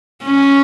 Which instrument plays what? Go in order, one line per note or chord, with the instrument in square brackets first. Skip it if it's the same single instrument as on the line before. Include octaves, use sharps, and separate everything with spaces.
[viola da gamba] C#4